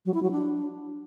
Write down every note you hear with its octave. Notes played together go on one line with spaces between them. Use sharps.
F#3
E4
F#3
D4